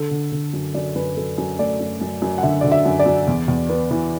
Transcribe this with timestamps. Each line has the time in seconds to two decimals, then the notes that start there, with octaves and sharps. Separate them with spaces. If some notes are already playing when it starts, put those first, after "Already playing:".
Already playing: D3 A4
0.11 D3
0.32 D3
0.53 F#2
0.75 F#2 D5
0.95 F#2 B4
1.17 F#2 A4
1.38 F#2
1.59 A3 D5
1.80 F#2
2.01 F#2
2.22 F#2
2.38 F#5
2.43 D3 E5
2.61 D3 D5
2.72 E5
2.86 F#2
2.99 D5
3.06 F#2
3.28 E2
3.48 E2
3.69 B3
3.91 E3